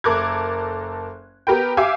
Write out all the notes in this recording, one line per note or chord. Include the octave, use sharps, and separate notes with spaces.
F#1 A4 A#4 D6 F#6 G#6
B3 G4 A#4 B4 G5
G4 E5 F5 G#5 D6